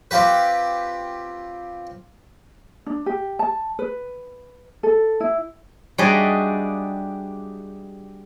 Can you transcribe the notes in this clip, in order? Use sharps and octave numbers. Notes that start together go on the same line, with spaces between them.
C4 F4 G4 B4
D4
G4
A5
B4
A4
E4
G3 D4 F#4 G#4 D#5 E5